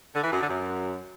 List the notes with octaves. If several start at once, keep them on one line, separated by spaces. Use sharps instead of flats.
D3
E3
F#2
D3
F#2